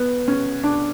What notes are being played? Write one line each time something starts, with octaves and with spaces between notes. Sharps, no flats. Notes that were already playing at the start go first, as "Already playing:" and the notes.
Already playing: B3
C#4
D4